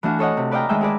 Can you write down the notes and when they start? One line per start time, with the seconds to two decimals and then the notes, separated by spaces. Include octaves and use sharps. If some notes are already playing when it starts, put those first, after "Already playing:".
0.03 E3 A3 D4 F#4 F5
0.19 A4 C#5 D#5 F#5
0.37 C3
0.51 B4 D5 D#5 F5 G5 A#5
0.69 D#3 G#3 A3 E5 G5 G6
0.81 D#4 E4 G#4 B4 D5